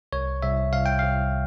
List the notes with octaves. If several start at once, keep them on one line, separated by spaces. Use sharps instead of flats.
C2 C#5
C2 E5
C2 F5
G5
C2 F5